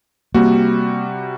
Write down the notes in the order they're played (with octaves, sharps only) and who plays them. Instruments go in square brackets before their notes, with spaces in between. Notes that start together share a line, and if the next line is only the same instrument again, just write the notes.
[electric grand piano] C3 G3 F#4 [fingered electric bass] A#3